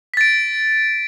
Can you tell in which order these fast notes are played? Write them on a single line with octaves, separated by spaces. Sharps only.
B6 A6 D7